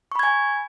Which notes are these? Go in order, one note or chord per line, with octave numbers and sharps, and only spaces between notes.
G#5 B5 C#6 G#6